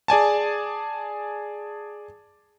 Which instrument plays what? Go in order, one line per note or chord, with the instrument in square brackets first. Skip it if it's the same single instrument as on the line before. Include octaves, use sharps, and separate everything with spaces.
[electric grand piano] G#4 D5 G#5 A5